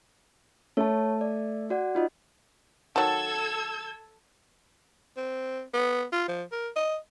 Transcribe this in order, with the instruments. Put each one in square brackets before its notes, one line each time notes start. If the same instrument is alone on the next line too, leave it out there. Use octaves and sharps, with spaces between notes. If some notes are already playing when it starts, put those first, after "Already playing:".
[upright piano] A3 [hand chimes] C#5 A5
[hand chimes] D5
F#4 D5 F#5
D#4 F4 D#5
[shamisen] D#3 F#3 [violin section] A4 E6 G#6 [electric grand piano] A5
[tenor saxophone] C4
B3
F4
F3
A#4
D#5